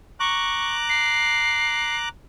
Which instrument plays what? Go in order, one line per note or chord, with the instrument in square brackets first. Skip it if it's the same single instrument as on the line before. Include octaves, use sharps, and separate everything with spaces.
[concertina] A#5 D6 F#6 [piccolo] C#6
[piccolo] C7